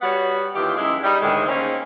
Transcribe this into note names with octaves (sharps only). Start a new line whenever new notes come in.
G3 B3 F#4 C#5 F#5
D#2 D#3 E3 F4 G4
F#2 G#3 E4
G3 D#4
D2 A2 D3 D#3 G#3
A#3 C4 C#4 D#4 G#4